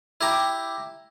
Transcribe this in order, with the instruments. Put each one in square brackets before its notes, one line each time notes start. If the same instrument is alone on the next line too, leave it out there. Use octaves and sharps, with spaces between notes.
[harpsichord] E4 G4 A#5 D6